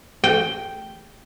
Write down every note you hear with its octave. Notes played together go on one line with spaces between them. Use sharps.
G5